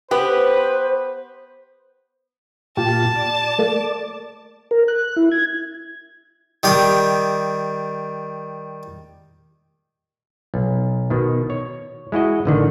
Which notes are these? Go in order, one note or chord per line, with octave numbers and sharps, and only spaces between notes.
B3 G4 B4 C5
A#2 F4 G4 A5
D5
A3 A#3
A#4
F#6
E4
G#6
D#3 G3 D#6
B1
B2 D#3
C#5
G#3 E4 F#4 D#5
A1 D3 D#3